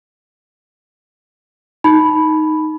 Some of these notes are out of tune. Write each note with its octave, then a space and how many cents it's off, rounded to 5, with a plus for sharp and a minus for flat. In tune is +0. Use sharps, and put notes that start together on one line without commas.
D#4 +0 B5 +0